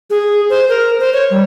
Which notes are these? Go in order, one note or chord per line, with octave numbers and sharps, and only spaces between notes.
G#4
C5
A#4
C5
C#5
G3